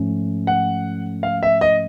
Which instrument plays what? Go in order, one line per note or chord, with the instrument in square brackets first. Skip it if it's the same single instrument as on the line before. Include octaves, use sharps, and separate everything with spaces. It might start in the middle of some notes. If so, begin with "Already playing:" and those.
Already playing: [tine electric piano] G#2 F3 A3 C#4
[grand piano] F#5
F5
E5
D#5